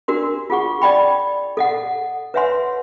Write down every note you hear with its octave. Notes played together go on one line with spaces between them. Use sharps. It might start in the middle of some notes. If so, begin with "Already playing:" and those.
D4 F#4 A#4 C6
F4 G#4 F#5 C#6
D5 D#5 G5 B5
A4 D#5 F#5
B4 C#5 E5 F#5 G#5 C6